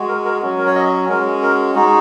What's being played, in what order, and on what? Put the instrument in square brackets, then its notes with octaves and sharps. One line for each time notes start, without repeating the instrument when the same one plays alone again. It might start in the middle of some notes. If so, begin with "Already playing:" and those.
Already playing: [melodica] G#3 F#4
A#4
A#4
F#3 C#4 F#4
A#4
C#5
D#5
G#3 C#4 F#4 A#4
A#4
G#3 D#4 F#4